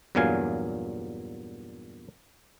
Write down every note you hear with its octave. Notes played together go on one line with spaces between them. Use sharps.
E2 G2 A#2 F#3 F5 G#5